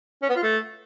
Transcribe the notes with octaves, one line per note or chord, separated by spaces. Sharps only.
C#4
B3
F4
A3